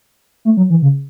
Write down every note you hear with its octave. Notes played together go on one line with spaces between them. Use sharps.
A3
F#3
E3
C#3